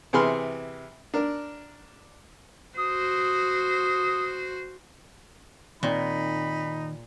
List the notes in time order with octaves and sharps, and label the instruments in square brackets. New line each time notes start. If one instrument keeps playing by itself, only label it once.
[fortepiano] C3 E3 G#4 B5 C6 F6
D4 A#4
[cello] F#4 C5 [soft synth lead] D#6
[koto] A#2 [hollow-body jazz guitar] D#3 C4 C6 [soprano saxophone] D#4 [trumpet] B5